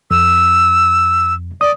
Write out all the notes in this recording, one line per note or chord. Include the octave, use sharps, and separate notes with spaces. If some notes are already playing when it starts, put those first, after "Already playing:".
F2 E6
D5 D#6